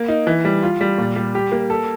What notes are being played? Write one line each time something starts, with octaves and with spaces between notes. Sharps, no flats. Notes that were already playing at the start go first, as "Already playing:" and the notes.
Already playing: A#3
D#4
E3
G3
F4
G3
A#2
G3
G4
A#3
A4